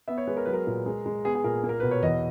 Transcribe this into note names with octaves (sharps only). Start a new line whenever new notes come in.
B3 E5
C#5
G#3 B4
A#4
F#3 B4
A#4
A#2
G#3
G#3
B3 G#4
G#4
A#2 A#4
A#3
A#4
B2 B4
C#5
E2 D#5